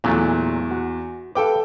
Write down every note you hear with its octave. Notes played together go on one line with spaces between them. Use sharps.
E2 A#2 F#3 A3
F#4
A4 B4 F5 G5 D6